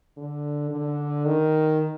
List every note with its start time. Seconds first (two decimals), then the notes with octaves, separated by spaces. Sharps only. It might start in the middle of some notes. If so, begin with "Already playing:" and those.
0.17 D3
0.71 D3
1.26 D#3